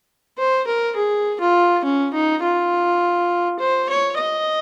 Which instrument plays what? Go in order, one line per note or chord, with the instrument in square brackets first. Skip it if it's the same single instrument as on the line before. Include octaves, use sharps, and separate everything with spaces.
[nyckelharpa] C5
A#4
G#4
F4
C#4
D#4
F4
C5
C#5
D#5